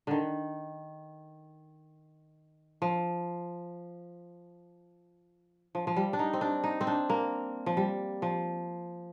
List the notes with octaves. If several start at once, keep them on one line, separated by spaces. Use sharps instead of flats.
D3 D#3
F3
F3
F3
G3
D4
D#4
C4
D4
D#4
C4
D4
A#3
F3
G3
F3